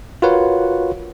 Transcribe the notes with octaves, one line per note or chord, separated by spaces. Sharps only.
F4 F#4 A#4 B4 C#5 F#5